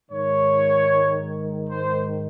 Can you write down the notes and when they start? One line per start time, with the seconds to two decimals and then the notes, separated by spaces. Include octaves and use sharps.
0.10 G#2 D#3 C#5
1.70 C5